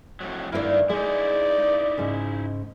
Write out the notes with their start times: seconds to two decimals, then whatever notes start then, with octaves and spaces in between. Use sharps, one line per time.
0.21 F2 A2 F#3
0.52 G2 D#3 A#3 E4 B4 D5
0.89 G#3 D#4 E4 D5
1.97 G#2 C#3